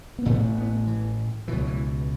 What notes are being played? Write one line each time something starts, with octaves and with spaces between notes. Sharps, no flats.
B3
A1 A2 A3
B3
E3
C#2 B2 E3
F#3
E3